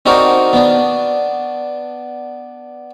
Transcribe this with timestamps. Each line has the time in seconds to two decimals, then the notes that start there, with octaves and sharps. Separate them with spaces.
0.06 C4 D4 D#4 F#4 A#4
0.53 B3 D4